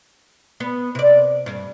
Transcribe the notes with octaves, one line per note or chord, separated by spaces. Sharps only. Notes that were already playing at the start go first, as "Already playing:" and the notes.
B3
C3 D5
G2